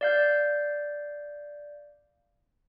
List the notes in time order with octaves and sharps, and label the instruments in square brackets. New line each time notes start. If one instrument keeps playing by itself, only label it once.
[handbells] D5 F5 G6